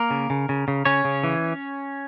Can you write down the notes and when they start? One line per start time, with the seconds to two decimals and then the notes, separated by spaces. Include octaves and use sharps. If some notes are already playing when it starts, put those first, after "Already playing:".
Already playing: A#3 A#4
0.10 C#3
0.30 C#3
0.49 C#3
0.68 C#3
0.85 C#3 C#4 C#5
1.05 C#3
1.24 E3